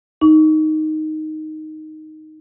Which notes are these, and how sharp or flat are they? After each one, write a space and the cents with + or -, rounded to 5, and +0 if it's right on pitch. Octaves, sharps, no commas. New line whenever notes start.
D#4 +0 C#6 +35